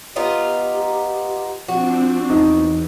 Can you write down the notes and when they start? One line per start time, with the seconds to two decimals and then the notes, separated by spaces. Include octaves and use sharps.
0.16 B3 D#4 F4 G4
1.68 F3 C4 D4 F#4
2.30 E2 D#4